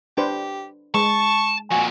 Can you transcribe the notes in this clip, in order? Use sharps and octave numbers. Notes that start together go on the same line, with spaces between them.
D4 G4 B4 C5
G#3 A5 C#6
F2 A#2 F#4 G#5